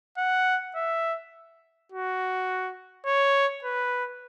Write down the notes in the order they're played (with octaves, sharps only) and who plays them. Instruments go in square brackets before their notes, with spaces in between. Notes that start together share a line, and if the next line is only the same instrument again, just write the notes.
[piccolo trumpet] F#5
E5
F#4
C#5
B4